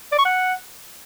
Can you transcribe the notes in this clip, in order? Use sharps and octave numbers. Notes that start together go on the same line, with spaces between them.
D5
C#6
F#5